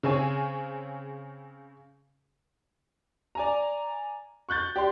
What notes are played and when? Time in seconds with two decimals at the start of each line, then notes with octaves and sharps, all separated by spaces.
0.03 C#3 C4 G#4 C#5 G#5
3.35 D5 G#5 A#5
4.49 C#6 F#6 G6 A6
4.76 G4 D5 C6